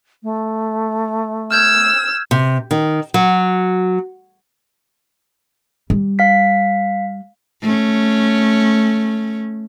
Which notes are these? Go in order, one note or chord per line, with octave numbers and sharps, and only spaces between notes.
A3
E6 F6 G6 G#6
C3
D#3
F#3
G3
F5 B6
A3 C#4